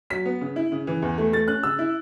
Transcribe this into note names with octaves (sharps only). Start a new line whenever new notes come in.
F#3 B6
B3
C#3
E4
C#3
E3
E2
A3
A3 A6
C#4 F#6
C#3 E6
E4